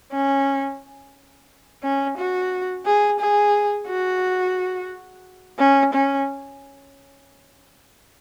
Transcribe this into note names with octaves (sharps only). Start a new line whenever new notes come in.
C#4
C#4
F#4
G#4
G#4
F#4
C#4
C#4